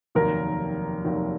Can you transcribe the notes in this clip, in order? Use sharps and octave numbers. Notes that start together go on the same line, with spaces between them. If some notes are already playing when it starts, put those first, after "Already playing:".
F1 D#2 D#3 F#3 A#4
F1 D#2 D#3 F#3